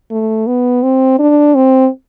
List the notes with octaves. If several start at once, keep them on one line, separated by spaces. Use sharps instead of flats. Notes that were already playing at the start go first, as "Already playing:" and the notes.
A3
B3
C4
D4
C4